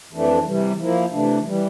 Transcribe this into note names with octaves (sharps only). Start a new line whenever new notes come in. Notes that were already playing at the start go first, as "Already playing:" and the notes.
F2 E3 A3 D4
C3 E3 G3
F3 A#3 E4
C3 E3 A3 D4
E3 G3